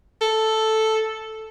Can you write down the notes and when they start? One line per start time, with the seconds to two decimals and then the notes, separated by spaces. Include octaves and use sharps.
0.21 A4